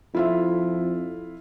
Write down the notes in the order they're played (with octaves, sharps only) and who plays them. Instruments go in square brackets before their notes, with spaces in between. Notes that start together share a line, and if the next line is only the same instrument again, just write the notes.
[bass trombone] F2 [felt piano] E4 F4 E5